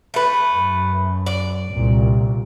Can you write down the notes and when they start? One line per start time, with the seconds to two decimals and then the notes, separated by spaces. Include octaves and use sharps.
0.14 A3 B4
0.49 F#2
1.26 D5
1.71 C2 A#2